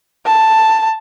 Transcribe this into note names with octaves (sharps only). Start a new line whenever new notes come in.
A5